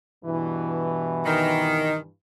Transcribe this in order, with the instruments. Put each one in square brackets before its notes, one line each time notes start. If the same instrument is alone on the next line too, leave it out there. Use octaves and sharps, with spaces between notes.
[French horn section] G2 B2 E3
[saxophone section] D#3